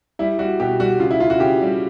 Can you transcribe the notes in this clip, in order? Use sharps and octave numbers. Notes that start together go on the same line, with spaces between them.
G3 E4
G3 F#4
B2 G4
G3 F#4
C#3 F4
E4
C#3 F4
F#4
C#3 G4
G3